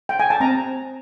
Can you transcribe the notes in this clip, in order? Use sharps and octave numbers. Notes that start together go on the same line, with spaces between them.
G5
G#5
A5
C4 A#5